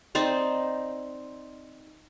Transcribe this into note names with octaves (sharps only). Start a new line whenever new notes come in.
C4 D#4 C5 D5